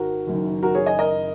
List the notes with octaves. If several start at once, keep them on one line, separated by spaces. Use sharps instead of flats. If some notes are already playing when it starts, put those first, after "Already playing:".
Already playing: G#1 F#4 A#4
F#1 F#2 D#3
F#4 A#4
G#4 C#5
D#5 G#5
A#4 D#5